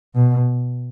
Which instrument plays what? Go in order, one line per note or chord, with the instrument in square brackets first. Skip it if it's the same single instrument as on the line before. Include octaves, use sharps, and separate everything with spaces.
[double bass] B2